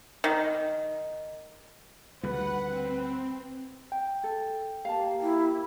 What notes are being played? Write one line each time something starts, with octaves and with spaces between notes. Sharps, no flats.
D#3
D2 C#3 G3 B4 F#5
C4
G5
A4
A#3 G4 F5 A5
E4